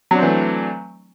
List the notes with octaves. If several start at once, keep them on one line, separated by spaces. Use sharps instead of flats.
E3 F#3 A3 C4 D4